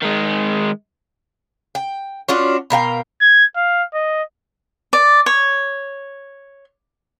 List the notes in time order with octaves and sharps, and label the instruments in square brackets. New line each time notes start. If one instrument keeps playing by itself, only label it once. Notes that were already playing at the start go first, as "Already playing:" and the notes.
[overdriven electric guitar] D#3 G#3
[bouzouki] G5
C#4 D4 F4 F#4
B2 A#4 F5 G5
[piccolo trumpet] G#6
F5
D#5
[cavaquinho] D5
C#5